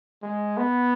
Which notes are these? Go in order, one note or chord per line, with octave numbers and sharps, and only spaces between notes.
G#3
B3